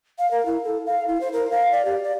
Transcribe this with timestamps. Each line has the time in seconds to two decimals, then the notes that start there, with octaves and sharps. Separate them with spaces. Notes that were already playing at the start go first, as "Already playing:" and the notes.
0.19 F5
0.31 A#4
0.46 E4
0.64 A4
0.86 F5
1.08 E4
1.21 C5
1.33 A#4
1.51 F5
1.72 D5
1.85 G4
2.04 D5